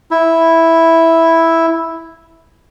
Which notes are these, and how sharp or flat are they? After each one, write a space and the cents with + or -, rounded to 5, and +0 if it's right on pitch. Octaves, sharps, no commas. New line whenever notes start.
E4 -5